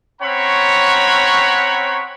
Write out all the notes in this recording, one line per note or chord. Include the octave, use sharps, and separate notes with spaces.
C4 C#4 C#5 F#5 A#5 B5